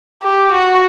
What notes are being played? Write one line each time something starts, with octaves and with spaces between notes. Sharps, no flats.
G4
F#4